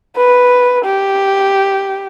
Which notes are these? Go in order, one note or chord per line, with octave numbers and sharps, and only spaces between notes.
B4
G4